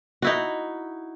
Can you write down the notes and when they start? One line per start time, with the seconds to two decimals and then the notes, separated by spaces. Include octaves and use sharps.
0.22 D#4 E4 F#4